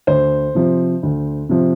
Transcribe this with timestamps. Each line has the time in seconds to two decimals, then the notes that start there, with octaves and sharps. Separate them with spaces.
0.07 D2 C5
0.55 C3 F3
1.03 D2
1.49 C3 F3